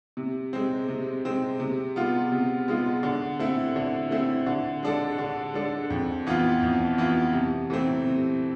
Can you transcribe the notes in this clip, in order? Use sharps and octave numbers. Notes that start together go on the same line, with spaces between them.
C3
G#3 C4
C3
G#3 C4
C3
G#3 B3 F4
C3
G#3 B3 F4
D3
A3 C4 E4
D3
A3 C4 E4
D3
G#3 D4 A4
D3
G#3 D4 A4
F2
E3 B3 F4
F2
E3 B3 F4
C3
E3 A3 C4
C3